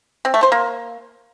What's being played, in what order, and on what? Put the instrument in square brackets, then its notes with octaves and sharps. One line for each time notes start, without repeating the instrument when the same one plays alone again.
[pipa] C4
A3
C5
A#3